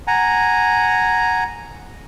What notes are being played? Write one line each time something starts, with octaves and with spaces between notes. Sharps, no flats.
F#5 G#5 A#5